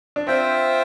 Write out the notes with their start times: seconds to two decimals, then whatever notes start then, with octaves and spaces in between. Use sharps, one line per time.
0.16 D4
0.27 C4 F4 C5 E5 G5